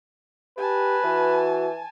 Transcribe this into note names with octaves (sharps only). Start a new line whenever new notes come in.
G4 B4 G#5 A5
E3 F#4